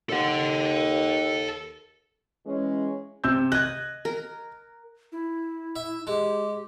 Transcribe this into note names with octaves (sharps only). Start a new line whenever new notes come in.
D#2 A4 F#5
E3 G#3 C#4
C3 E6 G6
D#5 F#6 G#6
A#4
E4
E5
G#3 G4